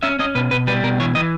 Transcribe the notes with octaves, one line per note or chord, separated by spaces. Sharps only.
C#4 E5
C#4 D#5
B2 B4
B2 B4
G3 B4
B2 A#4
E3 C#5
E3 D#5